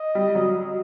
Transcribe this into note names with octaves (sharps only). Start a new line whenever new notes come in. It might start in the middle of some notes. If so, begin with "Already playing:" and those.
Already playing: D#5
G3
F#3